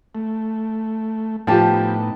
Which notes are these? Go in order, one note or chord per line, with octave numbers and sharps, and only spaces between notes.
A3
A2 F3 B3 D#4 G4 G5 A5